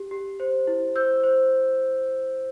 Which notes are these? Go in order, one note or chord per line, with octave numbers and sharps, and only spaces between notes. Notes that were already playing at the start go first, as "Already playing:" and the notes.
Already playing: G4
G4
C5
E4
C5 E6 G6
C5